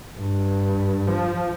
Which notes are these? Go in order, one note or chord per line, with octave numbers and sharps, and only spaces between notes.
G2
F3